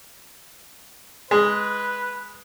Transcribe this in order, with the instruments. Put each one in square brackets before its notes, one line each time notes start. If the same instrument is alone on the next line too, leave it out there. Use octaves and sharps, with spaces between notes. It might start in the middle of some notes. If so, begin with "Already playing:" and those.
[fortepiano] G#3 [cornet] B4